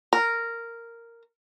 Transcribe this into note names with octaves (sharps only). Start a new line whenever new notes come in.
A#4